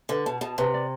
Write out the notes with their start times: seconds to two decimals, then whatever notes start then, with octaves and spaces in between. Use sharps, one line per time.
0.09 D3 B4
0.26 B2 A5
0.41 B2 A5
0.58 C3 B4
0.74 D5